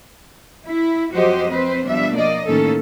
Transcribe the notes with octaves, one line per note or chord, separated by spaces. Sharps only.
E4
F2 F#3 F#4 G4 C5 D#5
C4 B4 C5
B2 F3 G3 D4 E5
A#3 D5 D#5
A2 D#3 A#3 C#4 A4